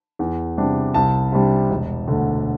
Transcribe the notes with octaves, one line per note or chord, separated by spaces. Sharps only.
E2
C3 G3 D4
C2 A5
C3 G3 D4
E1
D2 D3